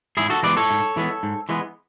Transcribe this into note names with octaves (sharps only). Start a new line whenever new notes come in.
G#2 E4 G#4
F#4 A4
E3 G#3 B3 B4 D5
A4 C#5
G#2
E3 G#3 B3
G#2
E3 G#3 B3